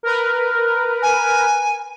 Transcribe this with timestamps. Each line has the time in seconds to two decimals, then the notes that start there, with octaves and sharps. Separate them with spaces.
0.03 A#4 B4
1.02 G#5